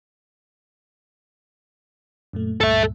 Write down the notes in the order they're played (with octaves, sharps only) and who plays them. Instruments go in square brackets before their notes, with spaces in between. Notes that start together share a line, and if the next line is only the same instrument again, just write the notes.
[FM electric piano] F#2 A#2 A3
[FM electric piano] C#2 G2 A#2 [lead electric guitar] A4 E5